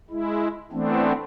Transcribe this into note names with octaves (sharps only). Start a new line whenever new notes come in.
G#3 E4
E3 A3 B3 C4 D4